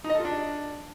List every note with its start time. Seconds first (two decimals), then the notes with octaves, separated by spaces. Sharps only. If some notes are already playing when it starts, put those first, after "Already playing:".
0.04 D#4
0.10 D#5
0.15 A4
0.20 F4
0.25 D4